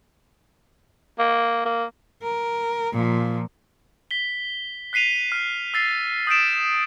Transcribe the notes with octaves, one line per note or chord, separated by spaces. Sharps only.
A#3
A#3
A#4
A#2 F3
B6 G7
F#6 B6 C7 D#7 F7
F6
E6 A6 C7
D#6 G6 A6 B6 D7 E7